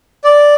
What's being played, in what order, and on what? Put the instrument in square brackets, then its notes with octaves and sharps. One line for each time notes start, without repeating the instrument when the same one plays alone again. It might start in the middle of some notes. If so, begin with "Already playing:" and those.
[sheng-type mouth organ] D5